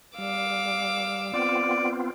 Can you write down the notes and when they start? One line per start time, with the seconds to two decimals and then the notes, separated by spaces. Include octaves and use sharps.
0.18 G3 F5 D6 E6
1.33 B3 C4 F4 D5